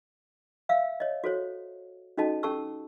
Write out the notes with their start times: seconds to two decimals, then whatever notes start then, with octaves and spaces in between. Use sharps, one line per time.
0.69 E5 F5 E6
1.00 C#5 D#5
1.24 F#4 A4 C5 C#5
2.17 C#4 D#4 F#4 A4 D#5 A5
2.43 C#4 G4 A4 A5 C#6 E6